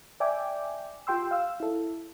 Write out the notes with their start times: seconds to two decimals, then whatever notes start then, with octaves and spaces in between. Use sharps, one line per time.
0.20 D5 E5 G5 G#5 D6
1.07 F4 G4 G5 C6 E6
1.31 F5 E6
1.60 E4 A4